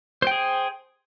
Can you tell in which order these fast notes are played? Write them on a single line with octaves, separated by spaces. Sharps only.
C5 G5 G#4